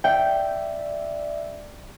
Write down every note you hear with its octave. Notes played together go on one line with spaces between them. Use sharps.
D5 E5 G5